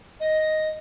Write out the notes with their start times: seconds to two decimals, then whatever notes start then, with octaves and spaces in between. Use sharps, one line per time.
0.20 D#5